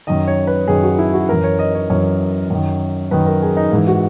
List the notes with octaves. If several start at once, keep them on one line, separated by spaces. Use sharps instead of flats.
F#2 D#3 D#5
C#5
B4
F#2 D#3 G#4
F#4
E4
F#4
F#2 E3 A#4
C#5
D#5
C#5
F#2 E3 C#5
F#2 D#3
F#2 D#3 B4
A#4
G#4
D#4
G#2 E3
F#4